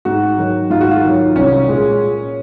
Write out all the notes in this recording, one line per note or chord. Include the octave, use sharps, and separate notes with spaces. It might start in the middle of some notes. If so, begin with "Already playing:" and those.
G#2 F#4
D#3 F#3
G#2 F4
F#4
F4
D#3 F#3
C2 C#4
A#2 G#3